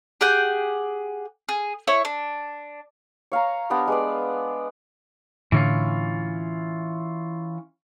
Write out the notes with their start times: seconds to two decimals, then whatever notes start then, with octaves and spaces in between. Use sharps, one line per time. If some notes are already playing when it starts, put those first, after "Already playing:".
0.21 G4 G#4 F#5 G6
1.49 G#4
1.87 E4 C#5 C#6
2.05 D4
3.32 C#5 F5 G#5 A#5
3.70 B3 D4 G4 A#4
3.87 G#3 B4 D5
5.52 A2 D3 E3 C#4 F4